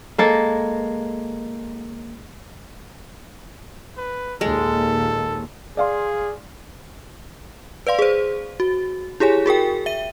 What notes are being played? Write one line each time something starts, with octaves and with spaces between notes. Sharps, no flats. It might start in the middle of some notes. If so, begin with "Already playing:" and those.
G#3 A#3 A4
B4
D#2 A#2 G#3 A4
G#4 D5 F5 C6
B4 D5 F5 C6
G#4 C5
F#4
E4 G4 G#4 C#5 G#5
F#4 G#4 A#4 G5
E5 D#7